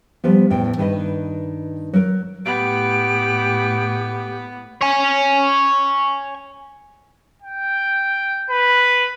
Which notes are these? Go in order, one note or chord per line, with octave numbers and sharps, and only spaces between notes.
F3 G3 B3
E2 A2 G5
G2 D#3 B4 D#5
F#3 A#4
A2 B3 G4 D7
C#5 G#5
G5
B4